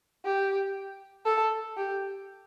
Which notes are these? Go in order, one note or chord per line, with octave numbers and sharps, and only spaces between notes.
G4
A4
G4